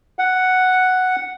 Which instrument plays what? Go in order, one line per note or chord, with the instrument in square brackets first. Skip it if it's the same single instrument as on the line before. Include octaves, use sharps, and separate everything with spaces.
[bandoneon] F#5